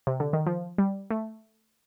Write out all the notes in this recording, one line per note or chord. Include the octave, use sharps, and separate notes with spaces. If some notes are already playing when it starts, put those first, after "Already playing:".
C3
D3
D#3
F3
G3
A3